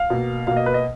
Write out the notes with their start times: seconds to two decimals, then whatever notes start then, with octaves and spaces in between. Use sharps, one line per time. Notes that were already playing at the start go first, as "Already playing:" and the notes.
Already playing: F5
0.10 B2 A#3
0.47 B2 A#3 F5
0.56 D#5
0.66 B4
0.74 D#5